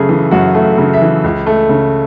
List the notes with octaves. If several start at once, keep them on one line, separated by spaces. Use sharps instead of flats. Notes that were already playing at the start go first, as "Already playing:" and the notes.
Already playing: F#2 C#3 A3 G#4
E3
F#2 F#4
A3
C#3
E5
E3
C#2
A3
C#3